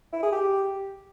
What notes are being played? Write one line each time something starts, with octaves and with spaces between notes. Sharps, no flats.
E4
G#4
G4